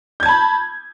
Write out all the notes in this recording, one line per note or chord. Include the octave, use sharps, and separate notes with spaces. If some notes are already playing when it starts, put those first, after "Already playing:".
A5 B5 G6 G#6